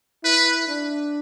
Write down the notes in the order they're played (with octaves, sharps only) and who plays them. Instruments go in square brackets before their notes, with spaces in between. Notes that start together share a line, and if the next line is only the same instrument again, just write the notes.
[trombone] E4 [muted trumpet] B4
[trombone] D4